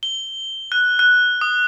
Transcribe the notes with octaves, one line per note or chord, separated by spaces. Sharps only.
G7
F#6
F#6
D#6